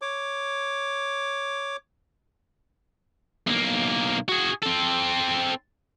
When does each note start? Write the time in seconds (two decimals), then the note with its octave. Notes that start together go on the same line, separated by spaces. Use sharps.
0.02 C#5 D6
3.47 B1 A#3
4.28 F#4 G#4
4.62 C4 A4